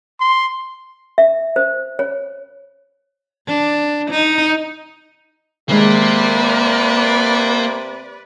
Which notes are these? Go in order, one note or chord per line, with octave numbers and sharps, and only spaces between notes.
C6
E5
C5
C#5
D4
D#4
C3 D#3 G#3 A#3 B4 D5